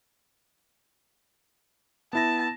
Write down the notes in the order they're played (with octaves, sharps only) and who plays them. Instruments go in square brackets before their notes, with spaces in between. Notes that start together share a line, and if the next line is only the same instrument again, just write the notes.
[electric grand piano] B3 E4 A#6 [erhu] A5